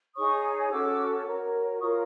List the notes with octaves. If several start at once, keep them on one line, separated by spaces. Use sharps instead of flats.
D#4 G#4 C#5 C#6 D#6
C#4 F#4 A4 D6 E6
F#4 A#4 C#5
F4 A#4 C#5 C#6 D#6